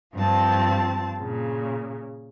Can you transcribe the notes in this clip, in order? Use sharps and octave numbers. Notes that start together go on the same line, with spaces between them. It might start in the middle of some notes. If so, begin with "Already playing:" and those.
G2 F3 C4 F4 A5
A#2 C#3